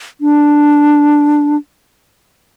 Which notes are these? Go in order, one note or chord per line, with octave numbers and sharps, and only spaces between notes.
D4